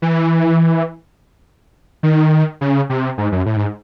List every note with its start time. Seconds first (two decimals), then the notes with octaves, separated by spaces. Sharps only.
0.02 E3
2.03 D#3
2.61 C#3
2.90 C3
3.18 G#2
3.32 F#2
3.46 A2
3.56 G#2